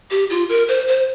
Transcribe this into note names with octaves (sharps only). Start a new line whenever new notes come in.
G4
F4
A#4
C5
C5